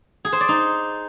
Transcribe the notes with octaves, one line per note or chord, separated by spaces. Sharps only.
G#4
C5
D5
D#4